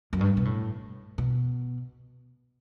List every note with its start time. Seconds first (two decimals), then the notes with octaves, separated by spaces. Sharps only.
0.13 F#2
0.21 G2
0.37 B2
0.45 A2
1.18 B2